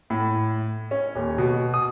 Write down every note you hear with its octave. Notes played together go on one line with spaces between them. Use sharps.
A2
C#4
D#1
B2
D#6